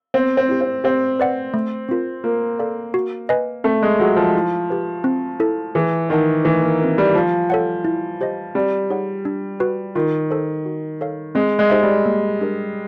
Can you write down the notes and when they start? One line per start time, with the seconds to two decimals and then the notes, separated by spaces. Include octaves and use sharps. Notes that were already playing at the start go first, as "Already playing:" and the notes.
0.14 B3 C4
0.37 C4
0.49 E4 G4
0.61 C4
0.84 C4 G4
1.20 B4 D5 F#5
1.54 A3
1.89 C4 F4 A#4
2.24 A#3 F4
2.59 A4 D5 F5
2.94 F#4
3.29 B4 D#5 G#5
3.64 A3 C4
3.83 G#3
3.99 F#3 F4 G#4
4.16 F3
4.35 E4
4.70 G4 B4
5.04 C4
5.40 E4 A4
5.75 E3 G#4
6.09 D#3 B4 D#5 F#5 A5
6.45 E3 A3
6.62 A#3
6.80 C4 F4 A#4
6.98 G3
7.14 F3 F4
7.50 A4 C#5 F#5
7.85 E4
8.21 G4 C5 D#5
8.55 G3 C4
8.90 D#4 G#4 C#5 F#5
9.25 D4
9.60 F#4 B4
9.95 D#3 F4
10.31 A4 C5
10.66 F#4
11.01 A4 C#5 F5
11.35 G#3 C4
11.59 G#3
11.70 D#4 G4 C5 E5
11.83 G3
12.06 A#3
12.41 D4 G4 A#4 D#5